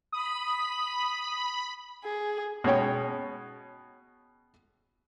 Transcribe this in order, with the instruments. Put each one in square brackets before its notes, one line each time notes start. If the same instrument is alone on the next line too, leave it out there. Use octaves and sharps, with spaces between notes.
[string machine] B5 [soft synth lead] D#6
[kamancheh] G#4
[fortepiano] B2 G#3 C#4 C#5 G5